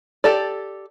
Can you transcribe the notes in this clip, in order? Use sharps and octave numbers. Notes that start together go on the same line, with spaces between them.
G4 A4 D5